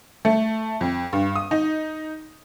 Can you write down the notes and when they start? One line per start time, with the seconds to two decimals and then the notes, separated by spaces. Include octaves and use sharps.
0.25 A3
0.81 F2
1.13 G2
1.35 D#6
1.51 D#4